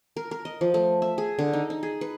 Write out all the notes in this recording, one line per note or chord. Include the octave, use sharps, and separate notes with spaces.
A#4
A#4
D#5
F3
A3
E5
G#4
D3
D#4
D#4
G#4
B4